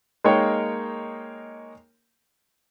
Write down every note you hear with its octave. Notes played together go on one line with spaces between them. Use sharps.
G#3 A#3 D#4 A#4 C#5 G5